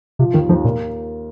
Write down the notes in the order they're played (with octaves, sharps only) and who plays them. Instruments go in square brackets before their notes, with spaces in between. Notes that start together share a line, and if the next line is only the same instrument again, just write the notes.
[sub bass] C3 [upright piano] F3
[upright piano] D#2 [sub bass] D#3
[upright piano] D#2 [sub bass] F3
[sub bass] A#2 [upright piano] A#3